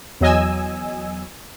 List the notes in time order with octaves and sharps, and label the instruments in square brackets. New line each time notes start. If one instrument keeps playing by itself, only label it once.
[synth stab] E2 F#3 D#5 G#5 E6